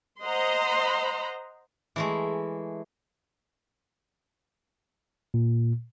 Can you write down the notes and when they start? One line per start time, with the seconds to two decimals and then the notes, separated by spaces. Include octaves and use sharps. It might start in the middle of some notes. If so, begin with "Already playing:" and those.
0.24 C5 D#5 F#5 A#5 C6
1.96 E3 G#3 A3
5.34 A#2